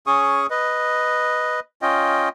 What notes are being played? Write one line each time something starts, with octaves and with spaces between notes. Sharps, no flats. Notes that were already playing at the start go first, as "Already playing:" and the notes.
C#4 G#4 C#6 D#6
B4 D#5
C#4 F4 D#5 G5